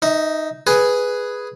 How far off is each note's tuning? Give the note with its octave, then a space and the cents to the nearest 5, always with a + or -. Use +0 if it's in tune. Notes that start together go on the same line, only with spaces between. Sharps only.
D#4 +0 E5 -30
G#4 +0 B4 +0 G#5 +0